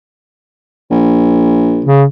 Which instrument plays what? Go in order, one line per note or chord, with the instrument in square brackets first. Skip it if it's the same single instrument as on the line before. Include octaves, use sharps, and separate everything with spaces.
[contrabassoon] A#1
[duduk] C#3